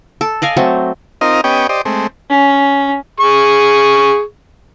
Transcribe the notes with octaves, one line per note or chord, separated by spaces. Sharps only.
A4
D5 D#5 F5 G#5
F#3 A3 C4
C4 D#4 F4 A#4 D#5
B3 C#4 G4 D#5 G5
G4 C5 D5 D#5
G#3 A3 C4
C#4
G#4 C#6